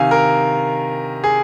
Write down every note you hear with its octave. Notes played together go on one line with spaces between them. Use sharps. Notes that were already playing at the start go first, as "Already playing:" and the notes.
Already playing: C3 D#3 F5 G#5
A#4
G#4